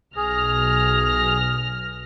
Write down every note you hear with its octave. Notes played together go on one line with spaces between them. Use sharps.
B1 G#4 F6 A#6